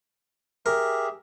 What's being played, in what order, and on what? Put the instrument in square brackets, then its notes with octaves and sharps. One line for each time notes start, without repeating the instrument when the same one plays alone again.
[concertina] G4 G#4 E5 [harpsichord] A#4